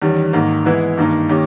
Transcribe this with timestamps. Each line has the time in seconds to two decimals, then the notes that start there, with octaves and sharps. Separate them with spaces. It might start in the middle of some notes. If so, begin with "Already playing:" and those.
0.02 E2 D#3 G3 C#4
0.33 G#2 D#3 A#3
0.65 E3 G#3 B3 E4
0.97 G2 D#3 A#3 D#4
1.29 D#3 A#3 C#4 G4